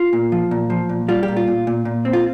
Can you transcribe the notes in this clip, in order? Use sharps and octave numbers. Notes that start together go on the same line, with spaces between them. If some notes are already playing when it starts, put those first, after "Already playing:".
Already playing: F4
A#2
F3
A#2
F3
A#2
G3 F4
G4
A#2
F4
A#2
A#2
A#2
C4
F4